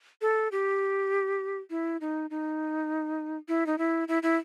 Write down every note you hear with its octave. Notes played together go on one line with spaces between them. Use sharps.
A4
G4
E4
D#4
D#4
E4
D#4
E4
E4
E4